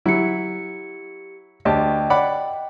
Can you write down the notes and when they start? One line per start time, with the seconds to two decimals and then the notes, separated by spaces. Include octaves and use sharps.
0.06 F#3 E4 G4 C#7
1.65 D2 G4 D#5 G5 A5
2.10 D5 F#5 B5